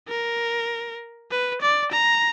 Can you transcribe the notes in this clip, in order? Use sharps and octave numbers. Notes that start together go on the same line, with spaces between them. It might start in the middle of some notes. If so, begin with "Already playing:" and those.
A#4
B4
D5
A#5